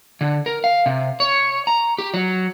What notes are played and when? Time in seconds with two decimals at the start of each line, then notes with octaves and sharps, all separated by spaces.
0.21 D3
0.46 A#4
0.64 F5
0.86 C3
1.20 C#5
1.67 A#5
1.98 G4
2.14 F#3